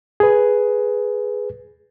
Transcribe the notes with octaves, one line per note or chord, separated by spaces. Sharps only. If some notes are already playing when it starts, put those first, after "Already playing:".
G#4 B4